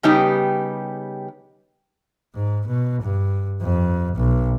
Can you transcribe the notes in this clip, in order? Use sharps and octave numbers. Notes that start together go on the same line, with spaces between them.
C#3 G3 B3 D#4 G4
G#2
B2
G2
F2
B1